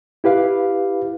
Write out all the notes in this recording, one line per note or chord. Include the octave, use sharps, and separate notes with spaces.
E4 G4 B4 F5